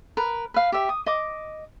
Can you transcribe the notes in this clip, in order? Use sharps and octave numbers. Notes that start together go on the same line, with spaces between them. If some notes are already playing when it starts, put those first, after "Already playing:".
A#4 B4
B4 F5
G4 E5
D#6
D#5 D6